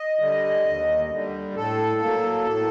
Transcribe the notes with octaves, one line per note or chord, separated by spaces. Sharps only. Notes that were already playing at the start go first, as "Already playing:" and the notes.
Already playing: D#5
D3 G3
D#2
D3 G3
A2 A4
F#3 A#3
A2